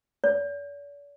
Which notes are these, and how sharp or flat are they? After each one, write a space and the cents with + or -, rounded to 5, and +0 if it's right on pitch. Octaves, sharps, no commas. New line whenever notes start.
D5 -45